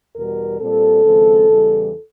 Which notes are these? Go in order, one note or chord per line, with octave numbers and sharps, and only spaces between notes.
E2 B2 G3 A#4
A#2 G3 C4 A4
D#2 C#3 F3 G#3 C4
E2 C#3 E3 G3